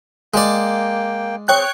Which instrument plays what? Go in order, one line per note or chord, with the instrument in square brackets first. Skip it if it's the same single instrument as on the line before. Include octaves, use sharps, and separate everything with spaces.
[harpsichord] G#3 D5 [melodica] A#3 G5
[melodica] C4 G#4 [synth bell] C#5 G5 F#6